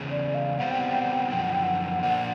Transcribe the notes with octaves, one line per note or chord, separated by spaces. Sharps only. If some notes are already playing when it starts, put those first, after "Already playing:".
Already playing: E2 C#3 G#3
D5
F5
B2 G3 C4 F#5
G5
F#5
G5
F#5
G5
F#5
F#2 D3 F3 G5
F#5
G5
F#5
A#2 F3 A#3 D4 F#5